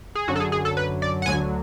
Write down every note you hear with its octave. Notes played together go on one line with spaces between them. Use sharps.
G#4
F#2 D3 F#3 F#4
A4
G#4
G#4
A4
B4
D5
F#5
D2 D3 F#3 G#5